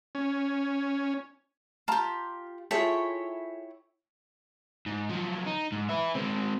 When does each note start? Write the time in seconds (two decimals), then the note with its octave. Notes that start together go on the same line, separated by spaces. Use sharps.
0.15 C#4
1.88 F4 G4 A5 A#5
2.71 E4 F4 G#4 A4 C#5 G5
4.86 G#2
5.10 F3 F#3
5.47 D#4
5.72 G#2
5.89 B4 E5
6.15 G#3 C4